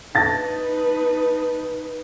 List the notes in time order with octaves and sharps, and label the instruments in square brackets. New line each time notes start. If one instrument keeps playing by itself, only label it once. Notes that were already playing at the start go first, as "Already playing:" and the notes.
[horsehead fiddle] D#4 B4 [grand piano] A5 A6 A#6